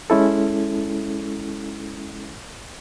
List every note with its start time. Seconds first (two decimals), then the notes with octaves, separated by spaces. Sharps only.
0.10 G#3 C#4 E4 A4